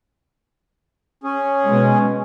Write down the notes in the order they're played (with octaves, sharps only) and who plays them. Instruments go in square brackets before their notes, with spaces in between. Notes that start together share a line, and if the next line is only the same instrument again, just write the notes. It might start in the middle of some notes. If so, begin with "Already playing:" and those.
[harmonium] C#4 G#4
[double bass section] B2 G#3